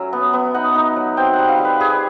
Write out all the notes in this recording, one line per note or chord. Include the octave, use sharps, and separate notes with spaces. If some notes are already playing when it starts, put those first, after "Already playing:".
Already playing: F#3 A3 C#4
B3
B3
D#4 F#5
D#4
F#3
C4 G5
G3 F#5
F5
G3
B4
G3 G#4